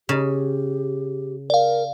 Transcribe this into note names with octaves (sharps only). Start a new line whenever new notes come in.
C#3 G4
A#4 D5 F5